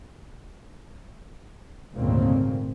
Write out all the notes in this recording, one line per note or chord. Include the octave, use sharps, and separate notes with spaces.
G#1 D2 A#2 C#3 A#3 C4